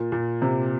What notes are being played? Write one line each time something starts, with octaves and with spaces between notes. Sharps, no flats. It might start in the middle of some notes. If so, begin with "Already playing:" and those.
Already playing: A#2
A#2
C3